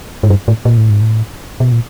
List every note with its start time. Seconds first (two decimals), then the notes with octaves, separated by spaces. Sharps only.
0.23 G#2
0.30 G2
0.48 A2
0.65 A#2
0.77 A2
0.90 G#2
1.01 A2
1.60 B2
1.72 A#2